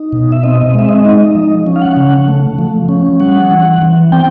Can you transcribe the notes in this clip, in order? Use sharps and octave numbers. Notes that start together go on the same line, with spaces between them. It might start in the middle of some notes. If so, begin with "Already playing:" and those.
Already playing: D#4
B2
E5
C4 D#5
G#3 E5
D#5
D#4
F3
C#4
F5
F#5
C#3
A3
F3
C#4
G3 F#5
E3
E3
C4 G5